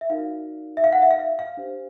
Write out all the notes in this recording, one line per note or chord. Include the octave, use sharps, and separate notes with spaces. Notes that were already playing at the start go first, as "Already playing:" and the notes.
E5
D#4 F#4 A#4 D5 F5
E5
F5
F#5
E5
F5
E5
F5
D4 G4 C5